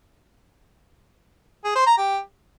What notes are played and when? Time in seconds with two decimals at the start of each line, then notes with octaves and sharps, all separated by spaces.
1.64 G#4
1.75 C5
1.86 A#5
1.97 G4